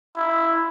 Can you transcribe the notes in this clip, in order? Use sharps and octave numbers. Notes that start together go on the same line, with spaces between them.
E4